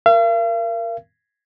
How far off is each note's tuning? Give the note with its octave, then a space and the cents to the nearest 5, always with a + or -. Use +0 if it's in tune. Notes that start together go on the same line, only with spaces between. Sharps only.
A#4 +0 F5 -45